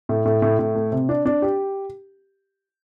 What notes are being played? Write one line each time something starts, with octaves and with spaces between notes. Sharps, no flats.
A2
A2
A2
A2
A3
C3
D4
D4
G4